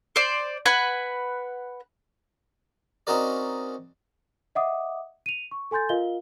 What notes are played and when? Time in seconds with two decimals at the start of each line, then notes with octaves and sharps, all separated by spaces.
0.16 C5 D5
0.66 B4 F#5 G#5
3.07 C4 C#4 D#4 F#4 A#4 D5
4.55 D#5 E5 F#5 D6 D#6
5.26 D#7 F7
5.51 C#6
5.71 A4 G#5 C6 G6 A6
5.89 F4 A#4 D#5 F5 G7